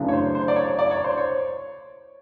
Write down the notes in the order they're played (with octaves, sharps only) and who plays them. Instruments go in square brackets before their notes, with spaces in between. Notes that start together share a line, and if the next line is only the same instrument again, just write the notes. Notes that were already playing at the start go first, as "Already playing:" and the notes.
Already playing: [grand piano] F#2 C#3 E3 A3 D4
C#5
C5
C5
D5
C#5
D5
C#5
C5
C#5